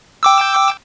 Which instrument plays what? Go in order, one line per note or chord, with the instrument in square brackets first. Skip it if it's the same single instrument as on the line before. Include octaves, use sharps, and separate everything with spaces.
[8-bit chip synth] G5 D6 E6